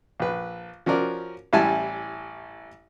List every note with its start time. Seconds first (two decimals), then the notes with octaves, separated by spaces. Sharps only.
0.20 A#1 B4
0.86 F3 C#4 F#4 A#4 D5
1.53 A1 G3 E4 G#5 A5